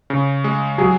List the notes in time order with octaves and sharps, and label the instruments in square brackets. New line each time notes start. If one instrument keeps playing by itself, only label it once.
[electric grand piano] C#3
G#3
[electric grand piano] F#3 [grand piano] G#4